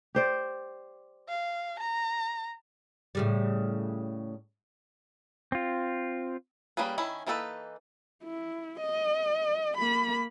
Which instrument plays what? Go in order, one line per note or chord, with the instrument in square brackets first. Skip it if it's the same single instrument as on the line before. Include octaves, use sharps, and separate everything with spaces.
[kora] G4 C5 D5
[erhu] F5
A#5
[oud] A2 C#3 G3
[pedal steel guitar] C4 F4
[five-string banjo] G3 A#3 C#4 G#4 B4
D#3 C#4 E4 C#5 B5
E3 A#3 D#4 A4 B4
[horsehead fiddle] E4
D#5
A#3 B5